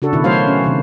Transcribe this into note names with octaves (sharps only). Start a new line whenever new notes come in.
C#3 D4 F#4 A4
B2 D#3 E4
F#3 A3 F#4 C5 C#5 F5
C#4
C3 D#3